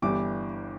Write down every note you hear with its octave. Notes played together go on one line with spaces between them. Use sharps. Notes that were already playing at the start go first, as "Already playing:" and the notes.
G1 G2 E3 G3 D6